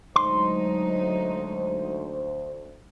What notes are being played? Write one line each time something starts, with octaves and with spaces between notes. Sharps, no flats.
D2 F#3 G#3 D#4 C5 C6